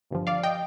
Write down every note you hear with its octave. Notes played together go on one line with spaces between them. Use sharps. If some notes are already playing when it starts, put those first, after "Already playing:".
G1 G2 F3
D5 F5
D#5 G5